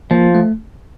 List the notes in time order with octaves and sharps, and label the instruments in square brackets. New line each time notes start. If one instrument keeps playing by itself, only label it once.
[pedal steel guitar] F3 [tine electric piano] A#3
[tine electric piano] A3